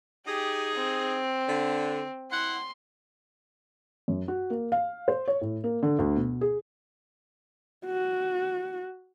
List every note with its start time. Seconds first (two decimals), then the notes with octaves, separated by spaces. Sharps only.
0.27 D#4 G4 G#4
0.75 C4
1.48 D3
2.32 E4 F#5 C6
4.08 F#2
4.28 F#4
4.50 A#3
4.72 F5
5.08 C5
5.28 C#5
5.41 A2
5.64 A#3
5.83 D3
5.99 D2
6.16 B2
6.41 G#4
7.86 F#4